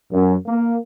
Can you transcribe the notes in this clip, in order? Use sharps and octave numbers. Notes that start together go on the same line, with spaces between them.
F#2
A#3